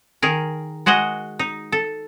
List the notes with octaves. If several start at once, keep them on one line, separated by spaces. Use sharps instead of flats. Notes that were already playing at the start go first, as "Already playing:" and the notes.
D#3 G#4 A#4
G#3 F#4 G#4 D#5 F#5
D#4
A4